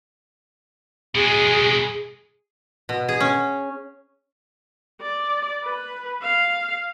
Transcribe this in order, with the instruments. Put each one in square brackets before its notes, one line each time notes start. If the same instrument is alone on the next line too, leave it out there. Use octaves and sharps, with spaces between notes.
[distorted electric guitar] B2 G#3 [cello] G#4
[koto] B2
G#4
C#4
[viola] D5
B4
F5